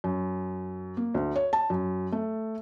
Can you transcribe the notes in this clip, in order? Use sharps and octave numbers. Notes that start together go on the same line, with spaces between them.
F#2
A#3
D2
C#5
A5
F#2
A3